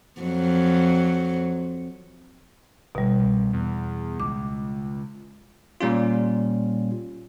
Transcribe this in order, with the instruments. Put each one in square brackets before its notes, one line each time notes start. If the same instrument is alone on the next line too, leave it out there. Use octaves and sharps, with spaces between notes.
[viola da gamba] F2 F#3
[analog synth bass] G1 [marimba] B2 G3
[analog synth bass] C2
E2
[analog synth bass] C#2 [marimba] D6
[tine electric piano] A#2 G3 C#4 F4